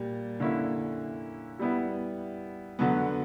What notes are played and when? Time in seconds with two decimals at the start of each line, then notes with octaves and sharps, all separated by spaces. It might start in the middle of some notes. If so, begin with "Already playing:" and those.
Already playing: A#2 G3
0.40 D3 A#3 C#4 E4
1.59 G3 B3 E4
2.79 D3 F#3 B3